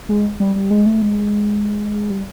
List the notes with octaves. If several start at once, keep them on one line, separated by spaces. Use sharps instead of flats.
G#3
G3
G3
G#3
A3
G#3
G3